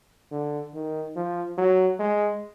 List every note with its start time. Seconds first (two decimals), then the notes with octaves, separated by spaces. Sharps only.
0.32 D3
0.74 D#3
1.16 F3
1.58 F#3
2.00 G#3